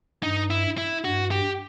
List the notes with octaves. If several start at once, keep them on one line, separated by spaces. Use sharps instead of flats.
G2 D#4
E4
E4
G2 F#4
G4